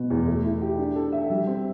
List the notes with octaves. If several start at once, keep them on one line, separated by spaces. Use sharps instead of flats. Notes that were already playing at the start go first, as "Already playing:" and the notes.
Already playing: B2 B3
E2
A3
E4
G4
D4
A4
E5
G3
C4